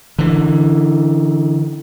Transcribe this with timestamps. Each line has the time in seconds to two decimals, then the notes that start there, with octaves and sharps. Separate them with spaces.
0.19 D3 E3